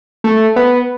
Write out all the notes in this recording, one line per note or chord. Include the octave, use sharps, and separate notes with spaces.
A3
B3